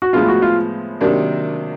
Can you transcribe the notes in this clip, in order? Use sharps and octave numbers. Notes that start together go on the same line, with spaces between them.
F#4
A2 F3 G#3 B3 F4
F#4
F4
C3 D#3 F#3 A#3 D4